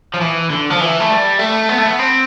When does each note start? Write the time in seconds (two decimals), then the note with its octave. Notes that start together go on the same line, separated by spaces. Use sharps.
0.14 F3
0.21 E3
0.50 D3
0.70 F3
0.81 E3
1.00 A3
1.10 G3
1.39 A3
1.69 B3
1.78 A3
1.86 B3
1.99 C4